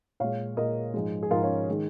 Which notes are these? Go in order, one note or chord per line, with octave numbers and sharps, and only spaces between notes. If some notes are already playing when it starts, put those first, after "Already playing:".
A#2 G#3 C#5 F5
A#2 G#3 A#4 D#5
G#2 F3 G#3
G#4
G#2 F3 G#3 F4 A#4
C#4 F4
D#3 G#3